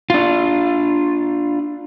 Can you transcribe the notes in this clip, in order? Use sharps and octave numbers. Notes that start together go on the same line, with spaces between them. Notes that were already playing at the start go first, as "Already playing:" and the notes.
D4 F4